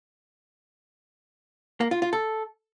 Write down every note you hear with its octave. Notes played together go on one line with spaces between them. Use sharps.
A#3
F4
F4
A4